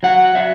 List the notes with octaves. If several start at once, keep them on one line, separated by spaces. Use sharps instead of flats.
F#3 F#5
F#3 E5